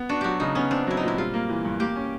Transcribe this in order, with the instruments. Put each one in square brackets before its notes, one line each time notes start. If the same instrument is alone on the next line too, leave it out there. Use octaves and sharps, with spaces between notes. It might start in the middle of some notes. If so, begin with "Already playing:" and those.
Already playing: [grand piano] B3
[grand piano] D4 [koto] F#4
[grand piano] F#3 [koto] F#4 G4
[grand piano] C#3 [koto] D#4
[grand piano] B3 [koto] C#4
[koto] C4 [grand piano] D4
[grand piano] F#3 [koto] E4
[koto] D#4
[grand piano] A#2 [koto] E4
[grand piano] G3 [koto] F4
[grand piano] A#3
E3
G2
[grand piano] A#3 [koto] G4
[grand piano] C#4